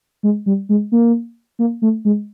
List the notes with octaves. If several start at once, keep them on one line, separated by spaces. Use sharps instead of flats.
G#3
G3
G#3
A#3
A#3
A3
G#3